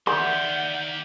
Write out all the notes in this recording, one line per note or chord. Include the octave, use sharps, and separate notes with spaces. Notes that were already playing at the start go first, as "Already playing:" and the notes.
D#3 G4 D5 E5 F#5 C6 G6